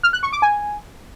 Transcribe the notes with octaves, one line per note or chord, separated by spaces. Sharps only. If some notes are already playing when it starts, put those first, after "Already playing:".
F6
F#6
C#6
D6
G#5